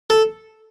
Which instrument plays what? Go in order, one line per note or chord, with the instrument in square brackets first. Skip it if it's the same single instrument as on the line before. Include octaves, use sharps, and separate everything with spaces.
[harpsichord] A4